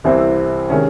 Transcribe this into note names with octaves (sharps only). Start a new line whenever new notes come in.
C2 C3 E3 C4 E4
C3 D#3 G#3 C#4